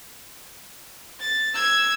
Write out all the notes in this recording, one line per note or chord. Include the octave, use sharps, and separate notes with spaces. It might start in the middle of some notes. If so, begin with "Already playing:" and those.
A6
E6 G#6